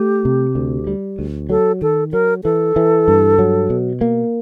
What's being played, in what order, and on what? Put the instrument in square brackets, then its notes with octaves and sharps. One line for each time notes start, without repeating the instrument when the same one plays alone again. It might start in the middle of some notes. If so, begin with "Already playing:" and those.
Already playing: [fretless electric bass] A3 [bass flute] G4
[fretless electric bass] C3
D2
G3
D2
[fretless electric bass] F#3 [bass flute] A4
[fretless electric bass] D#3 [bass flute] A4
[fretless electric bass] F#3 [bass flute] A#4
[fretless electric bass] E3 [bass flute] A4
[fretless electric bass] E3
G2
F#3
B2
A#3